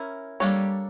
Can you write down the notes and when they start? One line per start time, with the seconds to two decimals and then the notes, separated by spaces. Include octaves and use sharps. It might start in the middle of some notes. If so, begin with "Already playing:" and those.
Already playing: C#4 E4 A#4
0.40 G3 A#3 D4 A4 C#5